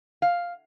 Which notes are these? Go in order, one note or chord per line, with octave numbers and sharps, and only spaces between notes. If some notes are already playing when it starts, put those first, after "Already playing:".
F5